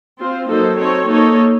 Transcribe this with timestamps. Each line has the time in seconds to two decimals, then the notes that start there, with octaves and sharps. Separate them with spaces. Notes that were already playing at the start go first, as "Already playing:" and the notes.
0.21 C4 F4 C5
0.50 F#3 A#3 D#4 A4 C5
0.79 C4 D#4 A4 C#5
1.09 A#3 D#4 A4 C#5